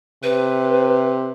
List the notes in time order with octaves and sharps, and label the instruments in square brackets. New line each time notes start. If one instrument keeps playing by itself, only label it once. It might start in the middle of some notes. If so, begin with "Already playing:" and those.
[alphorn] C3 [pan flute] B4